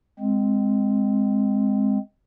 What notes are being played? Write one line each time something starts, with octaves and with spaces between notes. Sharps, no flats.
G#3 C4